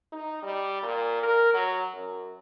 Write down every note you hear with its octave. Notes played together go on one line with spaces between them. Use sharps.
D#4
G3
A#2
A#4
F#3
F#2